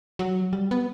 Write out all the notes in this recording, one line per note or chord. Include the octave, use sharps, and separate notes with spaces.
F#3
G3
B3